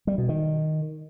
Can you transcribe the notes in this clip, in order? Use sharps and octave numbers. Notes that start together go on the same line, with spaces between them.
G3
B2
D#3